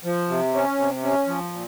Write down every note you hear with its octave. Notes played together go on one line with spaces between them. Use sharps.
F3
C3
C#4
C3
C#4
F3
A#2